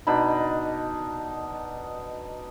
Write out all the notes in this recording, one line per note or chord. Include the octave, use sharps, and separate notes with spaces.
B2 D4 D#4 B5